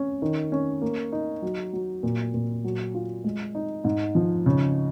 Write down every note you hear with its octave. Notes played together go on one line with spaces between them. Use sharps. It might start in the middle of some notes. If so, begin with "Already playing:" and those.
Already playing: C#4
D#3
C#4
A#3
D#4
F#3
F#3
A#2
A#2
F#3
F4
G#3
D#4
G#2
F3
C#3